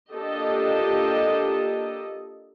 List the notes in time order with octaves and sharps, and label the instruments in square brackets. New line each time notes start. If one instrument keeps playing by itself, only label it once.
[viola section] A#3 D4 F4 G4 A4 D#5